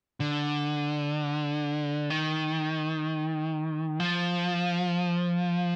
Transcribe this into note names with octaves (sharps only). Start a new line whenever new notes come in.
D3
D#3
F3